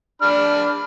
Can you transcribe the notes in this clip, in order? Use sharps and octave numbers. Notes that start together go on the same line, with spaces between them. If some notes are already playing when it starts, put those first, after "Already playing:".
D4 B5 F6